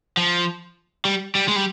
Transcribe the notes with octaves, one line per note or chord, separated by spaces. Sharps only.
F3
G3
G3
G#3
G3